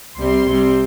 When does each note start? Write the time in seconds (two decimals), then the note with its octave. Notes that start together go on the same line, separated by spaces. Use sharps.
0.17 C2 C3 G3 C4 C6
0.47 C2 C3 G3 C4